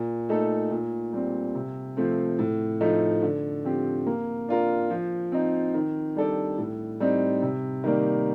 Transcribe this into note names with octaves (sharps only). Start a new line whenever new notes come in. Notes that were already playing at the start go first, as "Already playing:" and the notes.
Already playing: A#2
A3 D#4 A4
A#2
G3 C4
C3
F3 A3 C4
A2
F3 A3 D#4
D3
F3 C4 G4
A#3
D4 F4 A#4
F3
C4 D#4
D#3
G3 D4 A4 D5
A2
G3 C4 D#4
C3
D#3 G3 A#3